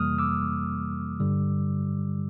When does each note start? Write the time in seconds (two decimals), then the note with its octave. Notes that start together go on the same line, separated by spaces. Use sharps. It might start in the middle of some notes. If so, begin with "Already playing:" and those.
Already playing: F2 C3 E3 G3 A#3 D#6 F6
0.19 D6 E6
1.20 G2 D3 G3